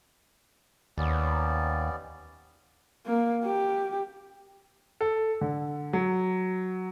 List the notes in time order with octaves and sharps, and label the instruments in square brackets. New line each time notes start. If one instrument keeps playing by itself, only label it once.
[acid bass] D#2 [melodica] B3 C#4 D5
[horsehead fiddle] A#3
G4
[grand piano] A4
D3
F#3